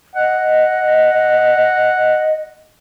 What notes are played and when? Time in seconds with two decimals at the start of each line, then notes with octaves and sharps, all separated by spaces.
0.16 D#5 F#5